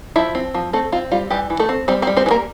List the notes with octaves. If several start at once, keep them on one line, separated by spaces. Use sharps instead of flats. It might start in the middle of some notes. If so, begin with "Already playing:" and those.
F3 E4 E5
C4
F3
A3 C4 A4
C4 F4
G3 F4
E3 G3 G4
E3
A3 A4
C4
G3 C4 C5
C4 C5
G3
C4 C5
E3
A#3 A#4